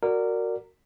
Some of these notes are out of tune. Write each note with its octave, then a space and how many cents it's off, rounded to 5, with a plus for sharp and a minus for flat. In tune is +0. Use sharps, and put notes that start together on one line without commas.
F#4 +0 A#4 -15 D5 +0